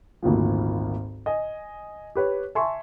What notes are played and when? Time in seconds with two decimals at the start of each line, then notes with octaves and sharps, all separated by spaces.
0.23 G#1 D2 A#2 F3
1.26 D#5 G#5
2.15 G4 B4 C#5
2.55 E5 G#5 A5 C6 C#6